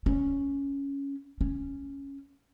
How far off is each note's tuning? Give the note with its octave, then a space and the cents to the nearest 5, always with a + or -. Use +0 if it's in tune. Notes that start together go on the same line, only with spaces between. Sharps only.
C#4 +5
C#4 +0